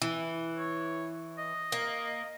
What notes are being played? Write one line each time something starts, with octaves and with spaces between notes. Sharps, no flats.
E3
C#5
D#5
A#3